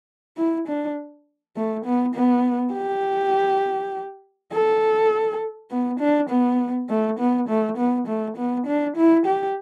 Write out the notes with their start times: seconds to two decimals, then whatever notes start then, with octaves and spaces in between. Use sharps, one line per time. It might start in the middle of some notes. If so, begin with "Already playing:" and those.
0.37 E4
0.68 D4
1.56 A3
1.85 B3
2.15 B3
2.74 G4
4.53 A4
5.71 B3
6.00 D4
6.30 B3
6.89 A3
7.19 B3
7.49 A3
7.78 B3
8.07 A3
8.37 B3
8.67 D4
8.96 E4
9.26 G4